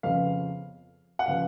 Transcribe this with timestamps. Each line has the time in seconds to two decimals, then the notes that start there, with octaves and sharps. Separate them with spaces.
0.03 F2 C#3 F3 B3 F5
1.19 F#5
1.26 C#3 F3 B3 F5